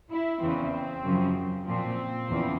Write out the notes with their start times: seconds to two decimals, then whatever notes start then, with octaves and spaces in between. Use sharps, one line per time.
0.09 E4
0.40 E2 C#3 E3 C4
1.03 F#2 C#3 F3
1.66 A#2 F3 C4
2.28 E2 C#3 F3